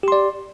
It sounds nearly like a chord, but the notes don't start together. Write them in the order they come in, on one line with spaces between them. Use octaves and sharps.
G4 C6 D5